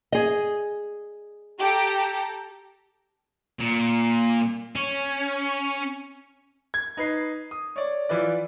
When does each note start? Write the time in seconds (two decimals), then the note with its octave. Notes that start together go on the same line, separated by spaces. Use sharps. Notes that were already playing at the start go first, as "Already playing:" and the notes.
0.12 G#4 D#5
1.59 G4 A4 A#5
3.60 A#2
4.76 C#4
6.74 G#6
6.97 D#4 B4 C7
7.51 D#6
7.76 C#5 D5
8.09 E3 F4 B4 D5